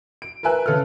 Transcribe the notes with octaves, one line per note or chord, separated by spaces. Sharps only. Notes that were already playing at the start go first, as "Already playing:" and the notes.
D7
A#4 B4 E5 G#5 F#6
C#3 A4 B4 F6